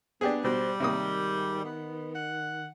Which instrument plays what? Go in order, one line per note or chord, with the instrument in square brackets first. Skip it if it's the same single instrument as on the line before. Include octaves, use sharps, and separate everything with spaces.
[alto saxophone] B3 [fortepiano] D4 G4 G#4
[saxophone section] G#2 G3 [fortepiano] B2 [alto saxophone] C5
[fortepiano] C3 A#3 D#6 [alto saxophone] D#3
[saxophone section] B3
F#5